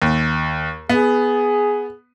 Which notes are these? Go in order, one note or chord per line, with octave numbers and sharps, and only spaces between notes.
D#2
B3 G#4